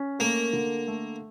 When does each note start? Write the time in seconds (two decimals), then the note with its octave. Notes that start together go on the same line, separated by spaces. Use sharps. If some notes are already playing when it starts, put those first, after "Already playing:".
Already playing: C#4
0.19 A3 A#3
0.53 D3
0.87 A3